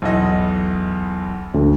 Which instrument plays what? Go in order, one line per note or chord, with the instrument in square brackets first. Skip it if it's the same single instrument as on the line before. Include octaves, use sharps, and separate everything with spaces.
[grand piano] B1 E2 D#5
[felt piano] D2